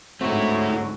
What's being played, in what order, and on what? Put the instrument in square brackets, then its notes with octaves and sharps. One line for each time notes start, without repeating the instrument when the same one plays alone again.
[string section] D2 G#2 [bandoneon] D3 F#3 F#4 [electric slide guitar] A3 E4 [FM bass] C4